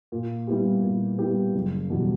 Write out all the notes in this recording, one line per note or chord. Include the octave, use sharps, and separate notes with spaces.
A#2
G3 B3 E4 G4
A#2
G3 B3 E4 G4
F#1
E2 B2 G3